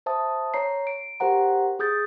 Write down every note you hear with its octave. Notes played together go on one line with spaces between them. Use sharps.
C5 E5 A5 D#6
C#5 A#5 C7
D7
G4 A#4 C5 F#5 A#5
G#4 D#6 G6 A6